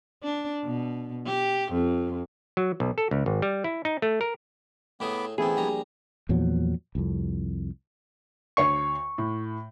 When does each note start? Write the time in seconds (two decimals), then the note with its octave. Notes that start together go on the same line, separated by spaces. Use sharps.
0.23 D4
0.65 B2
1.26 G4
1.72 F2
2.57 F#3
2.80 B1
2.98 A4
3.11 C#2
3.26 G#1
3.42 G3
3.64 E4
3.85 D#4
4.02 A3
4.21 A#4
5.00 A2 A3 B3 G#4 B5 D6
5.38 A1 A3 B3 C4 E4 G#4
5.57 A#1 G3 A#5
6.29 E2 A#2 F3 F#3
6.95 C2 F2
8.57 D2 C#5 C#6 C7
9.18 A2